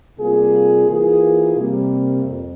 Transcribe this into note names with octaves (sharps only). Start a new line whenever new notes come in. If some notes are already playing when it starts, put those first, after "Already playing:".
C3 G3 A#3 F4 G#4
E3 A#3 F4 G#4
C3 G3 A#3
F2